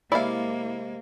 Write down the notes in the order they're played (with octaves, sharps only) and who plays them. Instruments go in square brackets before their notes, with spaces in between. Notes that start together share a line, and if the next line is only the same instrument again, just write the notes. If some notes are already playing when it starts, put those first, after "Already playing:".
[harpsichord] C3 G#3 [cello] A#3 [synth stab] E4 [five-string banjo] D5 F5